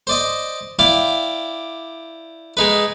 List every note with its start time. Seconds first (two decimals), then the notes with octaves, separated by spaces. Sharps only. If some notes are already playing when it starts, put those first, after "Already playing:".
0.07 C5 D5 D#5
0.79 E4 D5 F5 G5 D6
2.57 G#3 D#4 B4